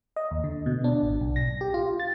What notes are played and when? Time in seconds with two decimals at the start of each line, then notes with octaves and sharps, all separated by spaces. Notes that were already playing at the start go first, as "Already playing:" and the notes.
0.16 D#5
0.31 D#2
0.44 D3
0.66 B2
0.84 D4
1.02 G#1
1.21 B1
1.36 A#6
1.61 G4
1.74 F4
2.00 A6